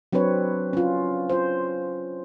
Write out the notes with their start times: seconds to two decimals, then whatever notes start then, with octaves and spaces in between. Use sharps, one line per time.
0.13 F#3 C4 D4 B4 C#5
0.73 C#4 F4
1.30 F4 C5